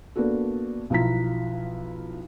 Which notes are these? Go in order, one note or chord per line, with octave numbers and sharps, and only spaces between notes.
A#3 B3 D4 F#4 A4
B1 F3 E4 F4 A#5 B6